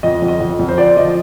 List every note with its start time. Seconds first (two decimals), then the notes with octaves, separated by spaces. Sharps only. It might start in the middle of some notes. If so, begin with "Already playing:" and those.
0.03 F2 D#5
0.22 F2
0.28 D#5
0.40 F2
0.59 F2
0.69 C5
0.78 F3 D5
0.97 F3 D#5